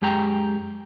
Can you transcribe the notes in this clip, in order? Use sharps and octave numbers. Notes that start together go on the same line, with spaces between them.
F#2 G#3 G4 G5 A#5